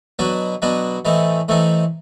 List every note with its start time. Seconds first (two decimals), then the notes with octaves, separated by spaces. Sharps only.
0.19 B2 F#3 B3 D4 F#4
0.62 B2 F#3 B3 D4 F#4
1.05 A2 E3 A3 C4 D#4
1.48 A2 E3 A3 C4 D#4